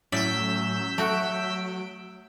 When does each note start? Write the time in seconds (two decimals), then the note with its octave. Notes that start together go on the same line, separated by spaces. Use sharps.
0.12 A2 F#3 C#4 D5 E5 E6 G6 B6
0.98 F#3 A3 F#4 D7